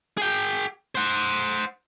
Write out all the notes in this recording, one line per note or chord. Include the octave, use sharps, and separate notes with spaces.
G#4 G5
C5 F#5